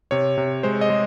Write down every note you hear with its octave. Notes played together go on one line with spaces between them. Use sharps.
C3 C#5
C3
G#3 C5
D#5
G#3